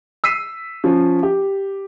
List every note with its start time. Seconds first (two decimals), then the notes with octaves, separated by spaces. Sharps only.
0.24 E6 B6 C7 D#7
0.84 F3 C#4
1.23 G4